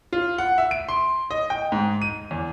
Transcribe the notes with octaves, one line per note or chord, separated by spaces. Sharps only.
F4
F#5
E5
D7
C6
D#5
G5
G#2
D#7
E2